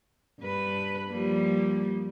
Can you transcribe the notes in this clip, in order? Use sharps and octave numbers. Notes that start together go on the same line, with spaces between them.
G2 B4
F3 G3 A#3